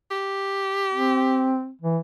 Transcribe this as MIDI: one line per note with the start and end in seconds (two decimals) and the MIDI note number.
0.11 1.59 67
0.94 1.71 60
1.82 1.98 52